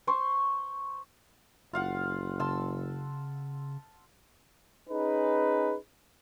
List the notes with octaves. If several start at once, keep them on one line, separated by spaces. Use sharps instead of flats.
C5 C6 C#6
F#1 F4 F5 F#5
C#3 A5 C6 E6
C#4 D#4 G#4 B4